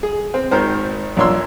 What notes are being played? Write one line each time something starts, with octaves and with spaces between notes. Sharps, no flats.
G#4
C4
G#1 D#3 A#4 C5
A#1 A#2 D4 C#5 C6 E6